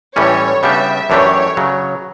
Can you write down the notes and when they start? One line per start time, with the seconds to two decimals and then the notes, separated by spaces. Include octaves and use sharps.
0.16 A2 E3 G3 C#4 C#5
0.63 C#3 G3 B3 D4 G4 E5
1.10 F#2 E3 A3 D4 G4 C#5
1.57 C#3 F#3